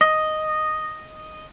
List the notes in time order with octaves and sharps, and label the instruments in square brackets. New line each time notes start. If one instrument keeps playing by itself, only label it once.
[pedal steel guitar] D#5